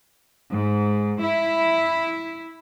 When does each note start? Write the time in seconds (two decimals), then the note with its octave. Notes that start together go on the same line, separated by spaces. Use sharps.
0.51 G#2
1.20 E4